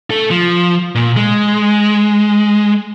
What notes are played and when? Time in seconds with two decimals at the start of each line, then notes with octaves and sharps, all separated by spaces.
0.11 A3 A4
0.31 F3
0.95 A#2
1.16 G#3